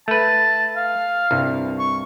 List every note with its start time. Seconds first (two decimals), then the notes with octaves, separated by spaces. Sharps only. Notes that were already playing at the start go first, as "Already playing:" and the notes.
0.08 A3 B4 A5
0.76 F5
1.31 C2 G2
1.79 C#6